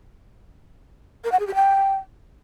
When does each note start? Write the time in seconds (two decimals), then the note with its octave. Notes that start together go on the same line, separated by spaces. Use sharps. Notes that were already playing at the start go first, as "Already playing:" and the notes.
1.24 A#4
1.32 F#5
1.39 G#4
1.47 G4
1.55 G5